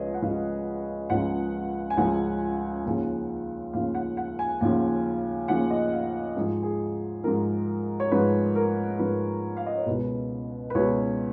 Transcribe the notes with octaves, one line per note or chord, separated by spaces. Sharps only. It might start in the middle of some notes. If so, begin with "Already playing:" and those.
Already playing: C#2 C#3 F3 G#4 B4 C#5 D#5
F#5
C#2 C#3 F3 F5
C#2 C#3 F3 F#5
G#5
C#2 C#3 F3 F#5
D#2 C#3 F3
D#2 C#3 F3 F5
F#5
F#5
G#5
D#2 C#3 F3
D#2 C#3 F3 F#5
D#5
F5
G#2 F3 G#4
G#4
G#2 F3 A#4
C#5
G#2 F3 B4
A#4
G#2 F3 B4
F5
D#5
C#5
C#2 B2 B4
B4
C#2 B2 C#5